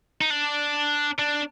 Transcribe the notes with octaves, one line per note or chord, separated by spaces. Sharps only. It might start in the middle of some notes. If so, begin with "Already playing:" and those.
D#4
D4
D4